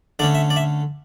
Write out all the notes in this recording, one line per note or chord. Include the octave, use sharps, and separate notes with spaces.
D3 A3 C#4 D5
E5
D5
E5